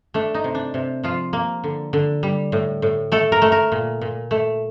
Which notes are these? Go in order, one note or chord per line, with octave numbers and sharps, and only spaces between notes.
A3 D4
D#4
C3
D4
C3
F3 F4
A#3
D3
D3
G3
A2
A2
A3 A4
A#4
A3
A#4
A#2
A#2
A3